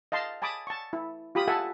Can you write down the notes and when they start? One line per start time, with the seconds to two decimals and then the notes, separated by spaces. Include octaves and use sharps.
0.12 D#5 F5 A5 C6
0.42 G#5 A5 B5 D6 D#6
0.67 A5 C#6
0.93 E4
1.35 F4 G4 B5 D#6
1.48 A4 E5 F#5 G#5 A5